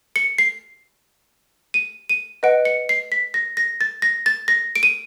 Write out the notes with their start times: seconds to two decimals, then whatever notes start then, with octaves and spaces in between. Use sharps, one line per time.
0.16 C#7
0.38 C7
1.74 D#7
2.09 D#7
2.43 B4 D#5 F#5 D7
2.65 C#7
2.89 C7
3.12 B6
3.34 A#6
3.57 A#6
3.81 A6
4.02 A#6
4.26 A6
4.48 A#6
4.76 D7
4.83 D#7